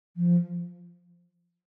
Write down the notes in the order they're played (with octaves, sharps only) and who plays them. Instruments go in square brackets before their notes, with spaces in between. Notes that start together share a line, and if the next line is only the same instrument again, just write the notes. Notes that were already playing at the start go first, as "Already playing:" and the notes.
[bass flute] F3